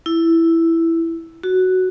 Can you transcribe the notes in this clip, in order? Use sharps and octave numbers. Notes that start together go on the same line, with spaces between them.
E4
F#4